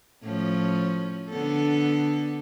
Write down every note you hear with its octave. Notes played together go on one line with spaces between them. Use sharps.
A2 F3 C#4
D3 B3 A4